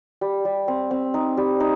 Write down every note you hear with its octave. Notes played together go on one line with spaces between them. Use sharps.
G3
G3
C4
C4
D#4
G3
D#4